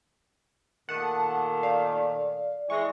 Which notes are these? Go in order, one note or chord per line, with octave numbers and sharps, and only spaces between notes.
A#2 D#3 A3 F#5 A5 D#6
D5 F5
E3 G#3 C#6 A#6